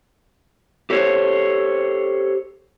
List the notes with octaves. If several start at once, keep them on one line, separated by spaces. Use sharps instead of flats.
G4 A4 C5 C#5